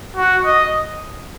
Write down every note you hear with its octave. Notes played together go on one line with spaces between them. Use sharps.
F#4
D#5